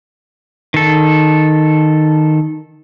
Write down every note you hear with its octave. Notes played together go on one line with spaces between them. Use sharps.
D#3 A4